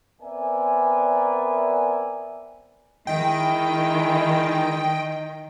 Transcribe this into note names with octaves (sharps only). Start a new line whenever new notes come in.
B3 C4 A#4 D5 E5 G#5
D#3 G#3 D#4 E4 D#5 G5